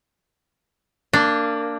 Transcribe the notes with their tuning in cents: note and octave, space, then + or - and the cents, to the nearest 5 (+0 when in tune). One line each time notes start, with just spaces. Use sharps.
A#3 -25 D4 +0